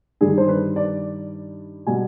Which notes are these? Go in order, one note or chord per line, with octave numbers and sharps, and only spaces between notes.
G2 D#3 G3 G#4
C5
B4
D5
B2 G3 G#5